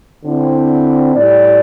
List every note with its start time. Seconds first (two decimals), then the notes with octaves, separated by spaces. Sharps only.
0.24 D3 C4 E4
1.14 A2 G3 E4 G4 D5